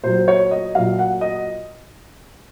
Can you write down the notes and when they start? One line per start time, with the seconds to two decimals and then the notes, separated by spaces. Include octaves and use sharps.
0.04 A#2 F#3 C5
0.28 C#5
0.51 D#5
0.75 A#2 F#3 F5
0.99 F#5
1.21 D#5